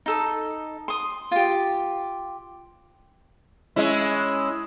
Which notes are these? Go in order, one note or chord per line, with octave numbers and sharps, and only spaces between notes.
D#4 A4 D#6
C6 D#6
F4 G4
G#3 C#4 E4